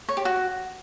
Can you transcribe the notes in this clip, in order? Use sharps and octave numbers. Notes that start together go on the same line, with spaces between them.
C#5
G4
F#4